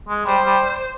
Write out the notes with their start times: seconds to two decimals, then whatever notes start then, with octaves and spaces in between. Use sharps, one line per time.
0.08 G#3
0.26 G3 C5
0.45 G3